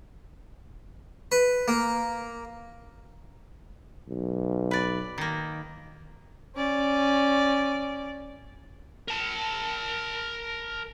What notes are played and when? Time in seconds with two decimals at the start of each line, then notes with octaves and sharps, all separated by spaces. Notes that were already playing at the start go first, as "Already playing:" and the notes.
1.32 B4
1.68 A#3
4.08 B1
4.71 B4 D5
5.18 D#3 A#3
6.55 C#4 D5
9.08 A#4 A5